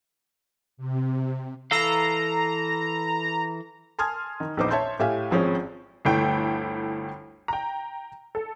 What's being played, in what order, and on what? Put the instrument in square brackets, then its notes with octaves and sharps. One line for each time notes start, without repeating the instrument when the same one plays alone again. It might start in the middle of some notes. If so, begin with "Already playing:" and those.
[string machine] C3
[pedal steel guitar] E3 A4 F5 [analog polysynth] A#5
[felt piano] G#5 A5 C6 D#6 F6 G#6
D#3
A#1 E2 D#4 B4 C5 D6
C#5 E5 A5 C6 G6
A2 G4 E5 F5 G#5
G#1 F3 C4 C#4 G#4
[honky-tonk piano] G1 D2 A3 E4 G5
G5 A#5
A4